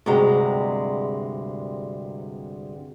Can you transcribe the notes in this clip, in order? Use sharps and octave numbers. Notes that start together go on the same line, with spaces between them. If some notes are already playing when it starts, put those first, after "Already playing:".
D2 G2 C3 G#3 A#5